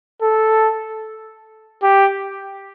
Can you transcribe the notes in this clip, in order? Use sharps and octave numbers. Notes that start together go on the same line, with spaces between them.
A4
G4